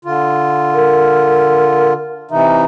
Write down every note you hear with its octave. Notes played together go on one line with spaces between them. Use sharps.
D3 F4
A#4
C3 E3 D#4 E5